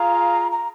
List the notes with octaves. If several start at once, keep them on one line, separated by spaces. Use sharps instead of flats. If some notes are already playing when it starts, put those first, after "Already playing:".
Already playing: F4 G#4 F5 A#5
A#5